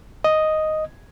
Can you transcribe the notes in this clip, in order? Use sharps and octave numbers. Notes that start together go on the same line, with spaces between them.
D#5